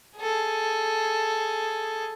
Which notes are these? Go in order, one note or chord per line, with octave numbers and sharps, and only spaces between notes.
G#4 A4